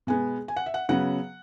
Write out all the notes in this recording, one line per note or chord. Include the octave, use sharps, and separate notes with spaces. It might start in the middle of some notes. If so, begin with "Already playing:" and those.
B2 G#3 B3 G#5
G#5
F#5
E5
F#5
C#3 F#3 B3 F#5